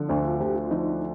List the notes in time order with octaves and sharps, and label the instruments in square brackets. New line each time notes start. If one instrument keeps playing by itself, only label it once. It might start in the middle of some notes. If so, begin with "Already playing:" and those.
Already playing: [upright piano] D3 F3
[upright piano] D2 [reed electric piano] D4
[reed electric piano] F4
[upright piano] D2 [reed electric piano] G4
[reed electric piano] F4
[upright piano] F3 [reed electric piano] D#4